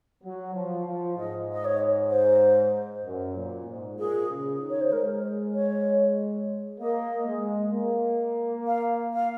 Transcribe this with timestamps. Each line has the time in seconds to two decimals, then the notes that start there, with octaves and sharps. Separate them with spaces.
0.24 F#3
0.55 F3
0.86 F3
1.17 G#2 D#5
1.52 D#5
1.65 C#5
2.10 C5
3.05 F#2
3.36 A#2
3.67 G#2
3.98 A#2 G#4
4.29 C#3
4.61 D#3
4.69 C#5
4.81 C5
4.92 G#3 A#4
5.54 C#5
6.79 A#3 D#5
7.26 G#3
7.73 A#3
8.67 F5
9.14 F5